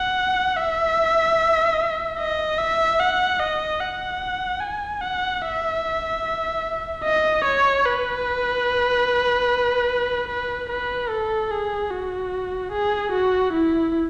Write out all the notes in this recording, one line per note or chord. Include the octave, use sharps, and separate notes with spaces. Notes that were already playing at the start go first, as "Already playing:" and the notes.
Already playing: F#5
E5
D#5
E5
F#5
D#5
F#5
G#5
F#5
E5
D#5
C#5
B4
B4
B4
A4
G#4
F#4
G#4
F#4
E4